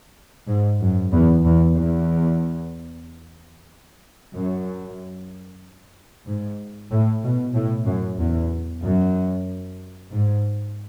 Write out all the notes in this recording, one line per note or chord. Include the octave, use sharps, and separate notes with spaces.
G#2
F#2
E2
E2
E2
F#2
G#2
A2
B2
A2
F#2
E2
F#2
G#2